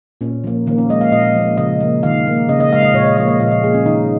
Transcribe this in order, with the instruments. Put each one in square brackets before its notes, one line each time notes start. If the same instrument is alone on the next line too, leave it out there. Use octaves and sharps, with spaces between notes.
[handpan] A#2 C#4
F3 A#3
D#3 A#3
C#4
G#3 D#5
F5
A#2 D#5
F3 A#3
C#3 D#5
A#3
D#3 F5
A#3
C#3 D#5
D#5
G#3 F5
D#5
A#2 C#5
D#5
F3 A#3 D#5
D#5
A#2 F5
D#5
A#3 G#4
C#4
D#3 D#4